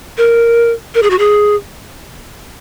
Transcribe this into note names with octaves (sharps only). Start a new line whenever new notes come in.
A#4
A#4
G#4
F#4
G#4